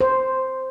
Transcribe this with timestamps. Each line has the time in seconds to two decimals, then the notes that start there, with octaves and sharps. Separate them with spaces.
0.01 C5